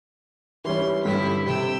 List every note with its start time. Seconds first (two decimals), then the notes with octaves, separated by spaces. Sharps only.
0.65 E3 G3 C#4 C6
1.05 G2 D3 E4 B6
1.47 C3 G5 E6